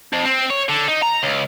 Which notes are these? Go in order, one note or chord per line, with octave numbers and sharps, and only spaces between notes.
F2
C4
C#5
D3
D#4
A#5
C#2